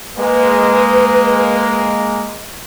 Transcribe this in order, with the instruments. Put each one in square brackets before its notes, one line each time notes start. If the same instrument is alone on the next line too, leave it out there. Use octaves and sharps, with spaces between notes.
[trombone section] G#3 A#3 [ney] B4